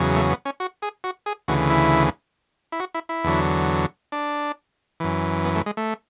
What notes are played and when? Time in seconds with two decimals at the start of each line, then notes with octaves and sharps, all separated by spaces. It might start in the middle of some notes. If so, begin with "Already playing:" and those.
Already playing: E2 C#3 F#3
0.16 A3
0.30 B3
0.45 C#4
0.60 F#4
0.82 G#4
1.04 F#4
1.26 G#4
1.48 D2 C#3 E3 F#4
1.70 E4
2.72 E4
2.80 F#4
2.94 E4
3.09 E4
3.24 E2 D3 F#3
4.12 D4
5.00 F#2 E3
5.45 B3
5.55 A3
5.66 G#3
5.77 A3